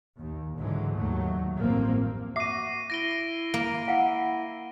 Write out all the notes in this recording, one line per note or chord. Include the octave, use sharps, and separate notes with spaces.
D#2
C#2 G#2 D3 E3 F#3 G#3
D#2 F#3 A3
A1 G2 F3 A#3 C4
F#4 E5 D6 C7 D#7
E4 A#6 D7 G7
A#3
E4 F5 F#5